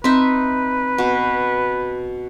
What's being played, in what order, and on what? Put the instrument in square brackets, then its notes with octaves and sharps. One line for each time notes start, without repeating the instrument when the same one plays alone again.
[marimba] C4 [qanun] D#4 E5 [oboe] B4
[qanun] B2